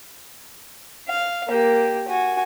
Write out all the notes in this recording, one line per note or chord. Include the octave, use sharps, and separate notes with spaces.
F5
A#3 G4
F#4 G#5